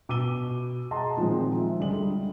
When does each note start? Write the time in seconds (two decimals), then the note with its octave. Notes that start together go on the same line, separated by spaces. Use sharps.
0.09 B2 D6 E6 D#7 G7
0.91 G#4 D#5 F#5 A5 A#5 C6
1.17 A#2 D#3 F3 F#3 G#3 C4
1.59 E5
1.78 C#2 D3 G3 G#3 D5 F#7
1.92 D3 G3